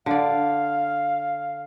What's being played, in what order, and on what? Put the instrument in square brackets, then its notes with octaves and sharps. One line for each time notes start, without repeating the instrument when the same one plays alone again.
[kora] D3 D5 [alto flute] F5